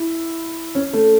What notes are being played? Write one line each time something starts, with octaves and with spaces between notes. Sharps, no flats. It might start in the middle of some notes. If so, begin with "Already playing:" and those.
Already playing: E4
C#4
A3